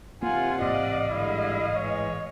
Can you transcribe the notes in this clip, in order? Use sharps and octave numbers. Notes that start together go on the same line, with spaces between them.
C3 A#3 F4 F#5 G#5
A1 G#2 D5 D#5 F5
D3 G3 G#3 E4
E3 G#3 C#5